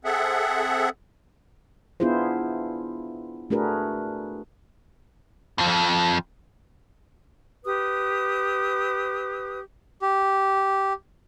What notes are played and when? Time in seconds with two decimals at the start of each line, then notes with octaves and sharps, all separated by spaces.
0.05 C4 G#4 A4 E5 F#5
2.00 B3 D4 E4 F4 G#4 C5
3.50 A3 D4 F#4 G#4 A#4 B4
5.58 F2 F3
7.66 G4 B4 D#6
10.02 G4